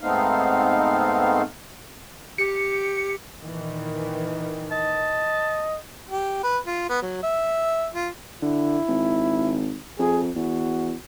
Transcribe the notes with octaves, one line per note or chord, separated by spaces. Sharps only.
G#2 A3 B3 C4 D#4 F5
G4 C#7
A#2 D#3 E3
D#5 A5
G4
B4
F4
B3
F#3
E5
F4
D3 E4
G#1
F2 G#4
E2 F#4